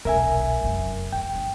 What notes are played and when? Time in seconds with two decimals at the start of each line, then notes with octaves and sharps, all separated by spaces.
0.05 D#1 B1 A#4 E5 G#5
0.61 F1 F#2
1.13 E2 F3 G5
1.33 G1